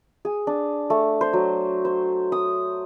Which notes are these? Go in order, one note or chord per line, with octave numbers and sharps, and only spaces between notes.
G#4
D4
A3
C5
F#3
C5
D#6